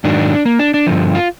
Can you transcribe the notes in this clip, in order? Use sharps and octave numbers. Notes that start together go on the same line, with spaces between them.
G#2 D#3 F#3 D4
A#3
D4
D4
G2 D3 F3
F4